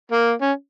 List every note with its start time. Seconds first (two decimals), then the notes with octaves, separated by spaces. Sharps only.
0.12 A#3
0.42 C#4